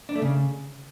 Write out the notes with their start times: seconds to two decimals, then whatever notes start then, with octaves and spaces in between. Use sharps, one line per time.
0.09 D4
0.15 A3
0.22 C#3